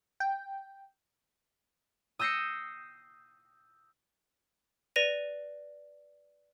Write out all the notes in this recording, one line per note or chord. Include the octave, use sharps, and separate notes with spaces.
G5
D#6 E6 G6 A#6 C7 C#7
B4 D5 A#6 D#7 F7